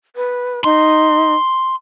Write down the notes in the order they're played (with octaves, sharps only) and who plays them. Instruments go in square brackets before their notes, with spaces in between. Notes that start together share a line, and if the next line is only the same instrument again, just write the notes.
[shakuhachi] B4
[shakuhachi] D#4 [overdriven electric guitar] C6